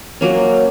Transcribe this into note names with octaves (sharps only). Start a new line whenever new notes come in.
F#3 A#3 C#4